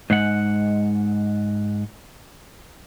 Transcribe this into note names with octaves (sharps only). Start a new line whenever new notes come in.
G#2 G#3 F#5